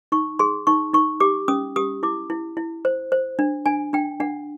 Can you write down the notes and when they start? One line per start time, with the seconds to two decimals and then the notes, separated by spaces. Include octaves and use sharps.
0.12 D#4 C#6
0.39 G#4 C6
0.67 D#4 C#6
0.94 D#4 C#6
1.20 G4 D6
1.48 C#4 D#6
1.76 G4 D#6
2.03 E4 D6
2.30 E4
2.57 E4
2.85 C5
3.12 C5
3.39 D4
3.66 D4 G#5
3.93 D4 G5
4.20 D4 F#5